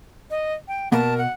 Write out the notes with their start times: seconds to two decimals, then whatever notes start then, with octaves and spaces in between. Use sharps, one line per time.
0.30 D#5
0.68 G5
0.92 B2 A#3 A#4 A5
1.18 F#5